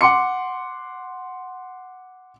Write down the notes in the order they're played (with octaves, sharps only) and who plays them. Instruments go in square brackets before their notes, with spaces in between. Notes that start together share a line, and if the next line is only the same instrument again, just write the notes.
[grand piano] F#5 C6 D6 C#7